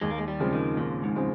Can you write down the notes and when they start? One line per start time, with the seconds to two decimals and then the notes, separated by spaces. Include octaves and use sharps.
0.01 D#2 G#3
0.10 A#3
0.18 G#3
0.28 G3
0.40 C#3 F3 G#3 C4
0.53 D#3
0.77 D#2 A#2
1.03 G#2
1.16 C#3 F3 G#3 C4